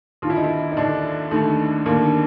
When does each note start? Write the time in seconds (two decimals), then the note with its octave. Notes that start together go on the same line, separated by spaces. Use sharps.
0.22 D#2 D3 F4
0.30 E4
0.37 D#4
0.44 E4
0.72 D#4
0.77 D#2 D3 D4
1.31 D#2 D3 A3
1.86 D#2 D3 A#3